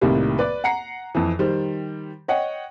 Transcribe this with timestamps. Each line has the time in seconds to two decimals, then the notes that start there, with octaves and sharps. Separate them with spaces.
0.01 C2 A2 C3 D#3 G3 A#3
0.39 B4 D5
0.64 F#5 A#5 C7 C#7
1.15 F2 E3
1.39 D#3 G3 C5
2.28 C#5 D#5 F#5 G5